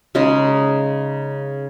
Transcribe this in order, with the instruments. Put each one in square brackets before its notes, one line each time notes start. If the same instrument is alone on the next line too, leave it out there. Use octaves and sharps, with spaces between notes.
[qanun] C#3 G#3 D#4